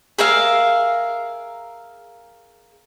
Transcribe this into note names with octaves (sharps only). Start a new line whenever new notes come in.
G#4 A#4 E5 F5